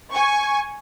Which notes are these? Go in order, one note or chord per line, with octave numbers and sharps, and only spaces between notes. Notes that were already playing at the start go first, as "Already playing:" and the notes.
G#5 C#6